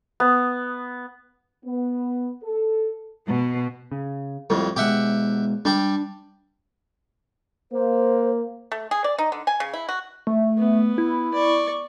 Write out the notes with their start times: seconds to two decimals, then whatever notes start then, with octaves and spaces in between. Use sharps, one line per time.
0.20 B3
1.65 B3
2.43 A4
3.28 B2
3.92 C#3
4.50 F2 A2 G3
4.76 B2 G#3 G4 E5 F#5
5.65 G3 D4 G4
7.72 A#3 C5
8.72 A3
8.91 G#4
9.04 D5
9.18 D#4
9.32 D3
9.47 G#5
9.60 C#3
9.74 E4
9.89 F#4
10.27 A3
10.58 B3
10.98 E4
11.34 D5 C#6